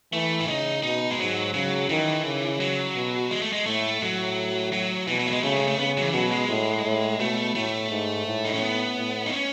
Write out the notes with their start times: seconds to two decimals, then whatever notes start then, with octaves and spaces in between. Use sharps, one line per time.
0.12 E3 A3
0.40 E4
0.48 C#3 D#4
0.83 B2 D#4
1.11 G#3
1.18 G#2 F#3
1.54 C#3 F#3
1.89 D#3 E3
2.25 C#3
2.60 F#3
2.95 B2
3.31 G#3
3.42 A3
3.53 G#3
3.66 A2 A3
4.01 A2 F#3
4.72 F#3
5.07 B2 E3
5.19 F#3
5.27 A3
5.31 G#3
5.43 C#3 A3
5.56 G#3
5.68 A3
5.78 C#3 B3
5.97 F#3
6.02 E3
6.13 B2 F#3
6.31 G#3
6.49 A2
6.84 A2
7.19 B2 A3
7.55 A2 A3
7.91 G#2
8.26 A2
8.45 D#4
8.53 C#4
8.61 B3
8.97 A2
9.26 D#4
9.32 C#4